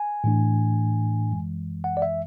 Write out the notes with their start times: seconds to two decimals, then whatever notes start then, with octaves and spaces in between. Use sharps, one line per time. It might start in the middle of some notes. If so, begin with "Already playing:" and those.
Already playing: G#5
0.24 A2 E3 A3 D4
1.31 F#2 E3 G#3
1.84 F#5
1.97 D5
2.02 E5